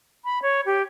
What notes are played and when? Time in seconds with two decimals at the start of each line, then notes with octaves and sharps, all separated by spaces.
0.25 B5
0.42 C#5
0.66 G4